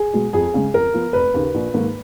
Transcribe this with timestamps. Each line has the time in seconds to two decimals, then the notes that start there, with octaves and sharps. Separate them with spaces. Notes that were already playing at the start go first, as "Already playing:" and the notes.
Already playing: G#4
0.13 B2 G#3
0.33 F2 G#4
0.54 C#3 G#3
0.73 F2 A#4
0.94 F3 B3
1.13 F1 B4
1.34 D#2 C#3
1.54 A#1
1.74 G#2 D#3 A#3